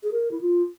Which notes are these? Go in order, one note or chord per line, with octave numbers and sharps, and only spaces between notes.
G#4
A#4
E4
F4